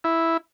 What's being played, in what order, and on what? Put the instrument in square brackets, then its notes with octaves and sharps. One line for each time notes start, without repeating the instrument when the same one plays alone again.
[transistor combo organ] E4